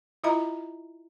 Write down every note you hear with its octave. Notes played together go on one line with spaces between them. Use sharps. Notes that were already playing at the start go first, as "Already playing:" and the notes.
E4 F4 D#5 E5 A#5 B5